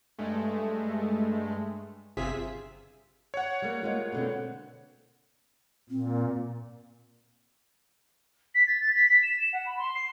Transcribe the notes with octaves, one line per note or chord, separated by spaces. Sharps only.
G2 G#3 A3
G1 C3 F4 G#4 E5 B6
C#5 F#5
G3 A#3
G#3 A#3 F4
B2 D3 C4
A#2 C4
B6
A6
A6
B6
B6
E7
E7
F#5
B5
C6
C7